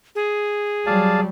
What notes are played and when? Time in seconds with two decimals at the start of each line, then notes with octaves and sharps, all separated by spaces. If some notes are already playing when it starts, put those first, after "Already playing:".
0.15 G#4
0.86 F#3 G3 D5 F5 A5